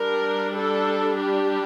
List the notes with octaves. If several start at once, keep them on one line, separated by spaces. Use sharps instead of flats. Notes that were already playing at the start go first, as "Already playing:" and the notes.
Already playing: G3 D4 A#4
A4
G4